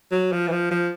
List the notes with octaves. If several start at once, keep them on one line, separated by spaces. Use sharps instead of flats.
F#3
F3
E3
F3
F3